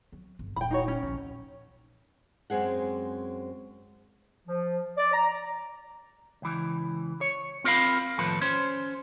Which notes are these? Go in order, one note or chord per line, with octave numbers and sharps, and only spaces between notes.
F#3
G1
D#1 G5 B5
D#4 F#4 C#5
C#4
A#1 D#3
F#2 G#3 C4 G#4 F#5
F3
D5
A#5
C#2 E3
C#5
C4 F4 A#4 C#5 F5 B5
D#2 A2 F3 A4 B4
C#4 C5